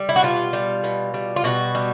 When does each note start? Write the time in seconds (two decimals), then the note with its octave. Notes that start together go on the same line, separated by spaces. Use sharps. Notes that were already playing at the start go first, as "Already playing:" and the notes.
Already playing: G3
0.09 E4
0.16 F#4
0.23 B2 F4
0.53 G3
0.84 B2
1.14 G3
1.36 F4
1.44 B2 F#4
1.75 G3